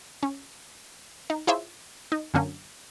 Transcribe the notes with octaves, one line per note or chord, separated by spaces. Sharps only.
C#4
D#4
E4 F4 G#4 C5 C#5 E5
D#4
F#2 D3 A#3 C#4